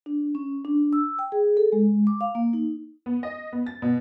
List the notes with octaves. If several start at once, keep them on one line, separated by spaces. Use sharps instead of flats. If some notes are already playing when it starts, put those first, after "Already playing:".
D4
C#4
D4
E6
G5
G#4
A4
G#3
D6
F5
A#3
D#4
B3
D#5
B3
A6
B2